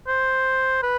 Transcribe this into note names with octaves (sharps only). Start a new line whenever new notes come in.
C5
B4